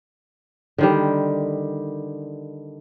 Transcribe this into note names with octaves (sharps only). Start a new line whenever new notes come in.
D3 D#3 G3